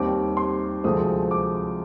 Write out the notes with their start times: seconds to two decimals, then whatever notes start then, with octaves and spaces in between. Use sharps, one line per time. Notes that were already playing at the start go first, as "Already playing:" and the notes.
Already playing: D#2 D#3 G3 C4 D6
0.37 C6
0.84 D2 C3 F3 G#3 C4 D#6
1.31 D6